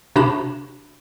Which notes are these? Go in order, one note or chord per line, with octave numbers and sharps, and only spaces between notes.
C3 D4 F#4 A5 B5 E7